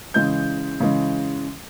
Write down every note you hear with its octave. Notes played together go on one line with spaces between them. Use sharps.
C#3 E3 G#3 G6
C#3 E3 G#3